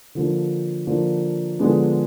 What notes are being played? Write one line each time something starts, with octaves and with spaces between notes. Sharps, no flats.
D3 F3 A#3 D4
D3 F3 A#3 D4
D3 F3 G#3 B3 D4